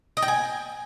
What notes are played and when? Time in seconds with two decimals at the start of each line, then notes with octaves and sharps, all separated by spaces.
0.17 D#5
0.22 G5
0.28 G#5